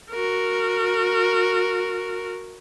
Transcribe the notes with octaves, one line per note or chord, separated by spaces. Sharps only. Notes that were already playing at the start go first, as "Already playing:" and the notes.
F#4 A#4